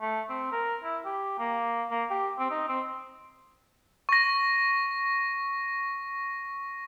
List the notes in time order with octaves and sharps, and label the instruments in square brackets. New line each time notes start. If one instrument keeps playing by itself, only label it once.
[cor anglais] A3
C4
A#4
E4
G4
A#3
A#3
G4
C4
D#4
C4
[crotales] C#6 A#6